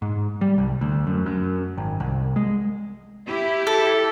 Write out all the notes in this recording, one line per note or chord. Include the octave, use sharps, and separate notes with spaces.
G#2
G3
C2
D2
F#2
F#2
G#1
C2
G#3
E4 G4
A4